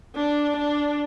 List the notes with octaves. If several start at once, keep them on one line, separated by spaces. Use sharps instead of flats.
D4
D4